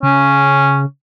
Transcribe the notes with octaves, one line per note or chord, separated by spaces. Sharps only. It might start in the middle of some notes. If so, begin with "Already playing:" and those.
C#3 C#4